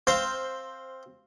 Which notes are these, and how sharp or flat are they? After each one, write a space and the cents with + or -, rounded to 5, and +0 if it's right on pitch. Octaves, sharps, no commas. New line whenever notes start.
C4 +10 C5 +0 F5 +0